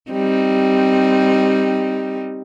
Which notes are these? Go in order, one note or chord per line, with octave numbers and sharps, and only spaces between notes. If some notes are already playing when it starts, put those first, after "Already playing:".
G3 C4 D#4